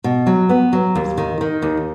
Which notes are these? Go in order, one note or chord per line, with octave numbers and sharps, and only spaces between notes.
B2
F#3
B3
F#3
D#2
D#3
D#3
D#2